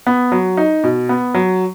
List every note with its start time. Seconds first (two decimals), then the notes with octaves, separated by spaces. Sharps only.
0.07 B3
0.32 F#3
0.57 D#4
0.84 B2
1.09 B3
1.34 F#3